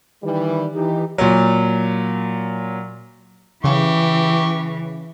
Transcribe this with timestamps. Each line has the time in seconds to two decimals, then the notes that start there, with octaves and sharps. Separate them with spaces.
0.23 D#3 E3 G3
0.74 E3 D#4 G4
1.18 A#2 F#3
3.64 C#3 E3 G4 C#6